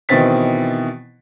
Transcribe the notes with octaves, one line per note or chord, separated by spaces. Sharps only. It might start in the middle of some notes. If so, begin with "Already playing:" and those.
B2 D#3 E3 C4 A6 B6